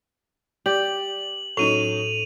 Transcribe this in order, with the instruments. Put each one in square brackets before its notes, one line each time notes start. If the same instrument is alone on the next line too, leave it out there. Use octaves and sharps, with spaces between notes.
[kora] G4 [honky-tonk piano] D5 [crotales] F#7
[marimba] A2 [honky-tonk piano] F#3 C#4 D#4 [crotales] D#7 F7